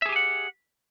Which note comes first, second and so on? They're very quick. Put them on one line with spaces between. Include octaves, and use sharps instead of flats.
E5 G#4 G4 G#5 F#5